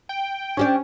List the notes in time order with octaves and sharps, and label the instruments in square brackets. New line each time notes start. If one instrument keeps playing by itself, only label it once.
[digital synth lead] G5
[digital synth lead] C#4 [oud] D4 G4 D5